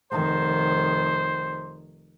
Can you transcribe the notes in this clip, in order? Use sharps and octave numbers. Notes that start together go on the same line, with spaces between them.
F1 D#3 C5